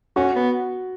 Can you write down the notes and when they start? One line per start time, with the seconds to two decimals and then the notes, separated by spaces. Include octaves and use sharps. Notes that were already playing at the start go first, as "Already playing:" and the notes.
0.16 C#4 F#4
0.36 B3